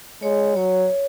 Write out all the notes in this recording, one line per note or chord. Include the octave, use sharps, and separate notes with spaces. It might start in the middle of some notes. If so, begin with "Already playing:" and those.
G#3 C#5
F#3 C#5